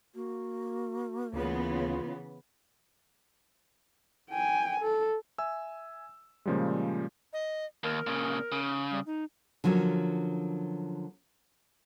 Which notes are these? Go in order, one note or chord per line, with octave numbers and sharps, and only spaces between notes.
A#3 F#4
D2 C#3 E3 B3 F4
G5 G#5
A4
E5 G#5 E6
A#2 C#3 F3 G3 G#3
D#5
D#2 A#4
A#2 C#3
C#3
G3
D#4
D3 F3 F#3 A#3 C#4